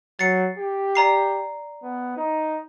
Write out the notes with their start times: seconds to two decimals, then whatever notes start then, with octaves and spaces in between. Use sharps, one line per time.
0.19 F#3 A6 C7 C#7
0.58 G4
0.95 D5 A#5 C7
1.83 B3
2.17 D#4